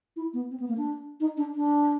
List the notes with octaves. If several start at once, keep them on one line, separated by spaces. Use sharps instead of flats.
E4
B3
C4
B3
A#3
D4
D#4
D4
D4